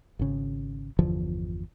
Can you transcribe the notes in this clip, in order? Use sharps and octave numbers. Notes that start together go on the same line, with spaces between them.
G#1 C#3
G1 E2 D3 F3